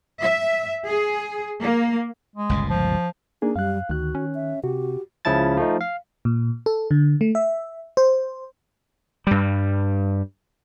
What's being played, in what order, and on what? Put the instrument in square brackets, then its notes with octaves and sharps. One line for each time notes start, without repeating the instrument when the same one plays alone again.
[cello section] E5
G#4
A#3
[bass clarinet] G#3
[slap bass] G1 C#2 A#2
[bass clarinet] F3
[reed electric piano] A#3 D4 G#4 [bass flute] D#4
[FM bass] F#2 [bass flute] G3 [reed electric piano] F5 F#6
[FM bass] D2 [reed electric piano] D#3 F#6 [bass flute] F#4
[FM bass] C#4
[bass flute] E5
[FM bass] C3 [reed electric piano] F#4 [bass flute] G4
[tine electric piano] C#2 C#3 F3 E4 A5 A6
F3 A3 D#4
F5
[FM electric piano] A#2
A4
D3
A3
E5
C5
[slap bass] G2 G3